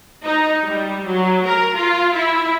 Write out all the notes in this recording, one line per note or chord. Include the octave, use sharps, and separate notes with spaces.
D#4
G3
F#3
A#4
F4
E4